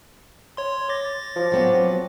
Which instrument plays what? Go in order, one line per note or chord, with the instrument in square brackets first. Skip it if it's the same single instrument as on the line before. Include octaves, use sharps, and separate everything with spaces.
[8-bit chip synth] C#5 C6
D6 A6 A#6
[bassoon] F3
[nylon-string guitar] F#3 B3 C4